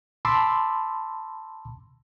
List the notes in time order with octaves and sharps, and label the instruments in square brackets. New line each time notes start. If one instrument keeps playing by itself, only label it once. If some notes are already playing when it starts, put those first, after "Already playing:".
[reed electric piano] A5 B5 C6 D6 E6